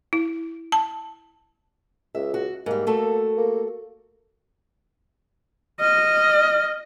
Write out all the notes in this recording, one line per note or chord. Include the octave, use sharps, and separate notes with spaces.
E4
A5
C#2 E5
F#4
G#2 G3 A#3
A3 F#4 A4
A#3
D#5 F6